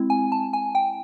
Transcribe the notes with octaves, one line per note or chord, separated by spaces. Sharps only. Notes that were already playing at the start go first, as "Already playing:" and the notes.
Already playing: G#3 C4 E4
G#5
A5
G#5
G5